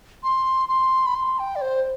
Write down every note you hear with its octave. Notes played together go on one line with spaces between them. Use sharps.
C6
C6
B5
C6
G5
D5
C5